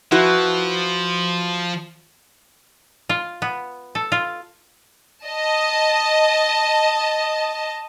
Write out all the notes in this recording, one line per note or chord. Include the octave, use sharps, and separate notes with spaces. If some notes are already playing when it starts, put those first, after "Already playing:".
F3 E4 F#4 B4
F4
B3
A4
F4
D#5 A5